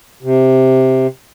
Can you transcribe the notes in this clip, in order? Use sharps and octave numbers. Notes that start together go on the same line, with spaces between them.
C3